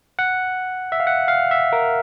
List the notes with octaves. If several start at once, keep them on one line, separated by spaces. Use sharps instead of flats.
F#5
E5
F5
F#5
F5
E5
A#4